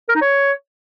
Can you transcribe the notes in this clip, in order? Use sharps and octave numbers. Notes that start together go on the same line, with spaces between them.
A#4
D#4
C#5